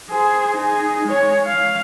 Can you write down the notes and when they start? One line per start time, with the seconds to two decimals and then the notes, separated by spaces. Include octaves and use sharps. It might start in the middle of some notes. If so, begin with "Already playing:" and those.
0.10 G#4 C5
0.57 D#4 G#4
1.05 G#3 C#5
1.47 F5